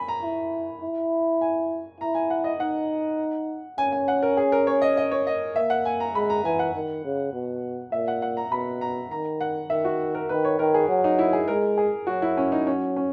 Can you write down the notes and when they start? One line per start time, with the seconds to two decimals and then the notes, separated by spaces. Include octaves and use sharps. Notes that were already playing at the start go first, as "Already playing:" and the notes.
Already playing: G#5 B5
0.08 A#5
0.22 E4
0.81 E4
1.41 G#5
2.00 E4 A#5
2.15 G#5
2.30 F#5
2.44 D#5
2.60 D#4 F#5
3.78 C#4 G#5
3.92 G#5
4.08 F#5
4.23 A#4
4.37 G#4
4.52 A#4
4.67 C#5
4.82 D#5
4.97 D#5
5.11 C#5
5.27 D#5
5.56 A#3 E5
5.70 F#5
5.85 G#5
6.00 A#5
6.14 G#3 B5
6.30 A#5
6.44 E3 G#5
6.59 F#5
6.75 D#3
7.04 C#3
7.33 B2
7.92 A#2 E5
8.08 F#5
8.22 F#5
8.37 A#5
8.51 B2 B5
8.81 A#5
9.11 D#3 A#5
9.41 F#5
9.70 D#3 E5
9.85 F#4
10.15 A#4
10.29 D#3 B4
10.45 C#5
10.59 D#3 A#4
10.74 G#4
10.89 F#3
11.04 D#4
11.19 E4
11.33 G#4
11.48 G#3 A#4
11.78 G#4
12.07 F#3 F#4
12.22 E4
12.37 C#4
12.52 D#4
12.67 C#4
12.96 C#4